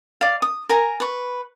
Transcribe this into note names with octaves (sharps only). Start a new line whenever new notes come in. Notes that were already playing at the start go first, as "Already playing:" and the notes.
D5 F5
D#6
A#4 G#5 A#5
B4 C#6